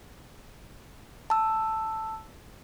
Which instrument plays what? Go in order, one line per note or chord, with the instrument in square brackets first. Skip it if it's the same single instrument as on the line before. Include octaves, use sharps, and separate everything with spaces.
[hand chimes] A5 E6